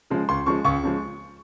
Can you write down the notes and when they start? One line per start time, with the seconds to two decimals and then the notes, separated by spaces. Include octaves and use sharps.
0.10 C#3 F3 G#3
0.29 C#2 C6
0.46 C#3 F3 G#3 C#6
0.65 C#2 C#6
0.83 C#3 F3 G#3